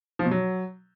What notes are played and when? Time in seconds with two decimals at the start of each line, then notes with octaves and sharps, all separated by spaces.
0.19 F3
0.25 B2
0.31 F#3